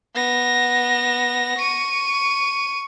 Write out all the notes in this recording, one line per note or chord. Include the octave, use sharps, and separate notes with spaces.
B3 A#6
C#6 D#7